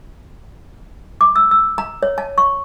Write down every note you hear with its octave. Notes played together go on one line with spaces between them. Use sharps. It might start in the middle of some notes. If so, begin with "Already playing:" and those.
D6
E6
E6
A#5
C#5
A5
C#6